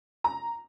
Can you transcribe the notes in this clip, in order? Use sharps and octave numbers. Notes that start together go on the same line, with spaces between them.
A#5